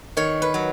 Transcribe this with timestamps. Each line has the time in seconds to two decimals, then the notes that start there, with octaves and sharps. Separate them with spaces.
0.17 D#3 C#5
0.42 B4
0.54 F#3